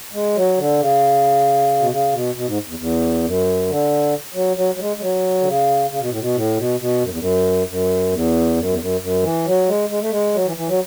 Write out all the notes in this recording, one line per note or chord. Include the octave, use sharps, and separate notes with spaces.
G#3
F#3
D3
C#3
B2
C#3
B2
B2
G#2
E2
E2
F#2
D3
F#3
F#3
F#3
G#3
G#3
F#3
D3
C#3
C#3
B2
A2
B2
A2
B2
B2
F#2
E2
F#2
F#2
E2
F#2
E2
F#2
F#2
E3
F#3
G#3
G#3
A3
G#3
F#3
E3
E3
F#3